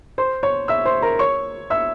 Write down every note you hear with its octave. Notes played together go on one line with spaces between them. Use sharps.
C5 C6
C#5 C#6
E5 E6
C5 C6
A#4 A#5
C#5 C#6
E5 E6